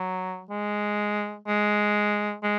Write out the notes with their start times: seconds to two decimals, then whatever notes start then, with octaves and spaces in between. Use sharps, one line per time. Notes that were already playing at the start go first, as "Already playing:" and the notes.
Already playing: F#3
0.50 G#3
1.48 G#3
2.43 G#3